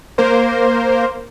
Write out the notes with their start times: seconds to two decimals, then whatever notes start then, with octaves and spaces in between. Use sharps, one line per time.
0.18 A#3 A#4 C5